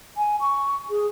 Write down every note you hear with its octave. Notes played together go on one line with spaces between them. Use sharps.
G#5
C#6
G#4